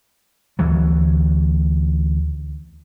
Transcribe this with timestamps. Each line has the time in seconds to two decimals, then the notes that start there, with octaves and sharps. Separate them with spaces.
0.59 D2 E3 F#3